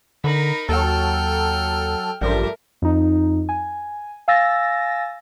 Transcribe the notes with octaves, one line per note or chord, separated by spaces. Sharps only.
D3 D#4 A#4 B5
D#2 F#3 A4 G5 F6
A1 G2 F3 G3 A3 A#4
F2 D#4
G#5
F5 G#5 E6 A6 A#6